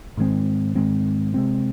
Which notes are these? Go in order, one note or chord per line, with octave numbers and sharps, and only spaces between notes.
G#2 D#3 G#3 C4
G#2 D#3 G#3 C4
C3 G#3 C4